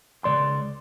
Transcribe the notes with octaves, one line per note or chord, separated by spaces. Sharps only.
C#2 G2 D5 C6